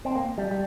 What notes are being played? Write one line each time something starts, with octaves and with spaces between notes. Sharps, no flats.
C4
A#3
G3
G3